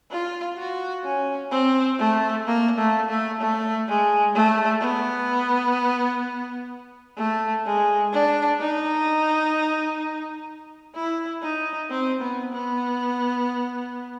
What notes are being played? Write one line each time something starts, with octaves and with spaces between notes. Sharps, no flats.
F4
F#4
C#4
C4
A3
A#3
A3
A3
A3
G#3
A3
B3
A3
G#3
D4
D#4
E4
D#4
C4
B3
B3